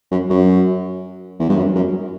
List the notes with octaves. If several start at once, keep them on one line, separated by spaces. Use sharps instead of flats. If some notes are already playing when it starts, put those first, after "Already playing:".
F#2
F#2
E2
G2
F#2
F#2